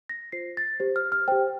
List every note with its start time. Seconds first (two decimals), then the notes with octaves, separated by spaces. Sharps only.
0.09 A#6
0.32 F4 C5 C7
0.57 A6
0.80 G4 C5
0.96 F6
1.12 F6
1.28 G4 C5 G5